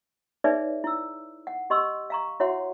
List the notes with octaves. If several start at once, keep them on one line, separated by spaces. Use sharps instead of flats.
D#4 G#4 B4 C#5 D5 E5
E4 E6
F#5
G4 D#5 C6 C#6 E6
F5 A#5 C#6
E4 F#4 C#5 E5 F#5 C6